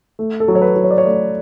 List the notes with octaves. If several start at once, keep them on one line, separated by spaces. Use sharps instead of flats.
A3
A4
F#3
C#5
B4
F#3
C#5
D5
C#5
A3 D5